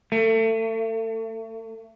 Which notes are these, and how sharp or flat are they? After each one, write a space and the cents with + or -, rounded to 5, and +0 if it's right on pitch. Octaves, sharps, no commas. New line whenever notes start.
A3 +30